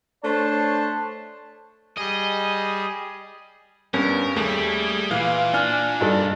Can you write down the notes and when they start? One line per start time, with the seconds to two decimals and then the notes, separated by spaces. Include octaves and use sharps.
0.23 A3 D4 C5 C#5 A5
1.98 G3 G#4 D#5
3.94 G2 B3 C#4 A#4
4.36 D#2 G3 A3 G#4
5.11 A#2 E3 F5
5.54 D4 G#5 F6
6.01 G2 D#4 A4